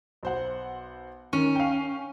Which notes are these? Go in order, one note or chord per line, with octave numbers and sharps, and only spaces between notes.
B1 C5 F#5
D#3 C#4
F5 G5